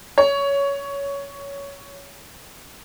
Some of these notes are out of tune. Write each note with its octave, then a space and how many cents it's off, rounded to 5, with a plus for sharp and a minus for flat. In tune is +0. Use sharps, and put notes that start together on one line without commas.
C#5 +15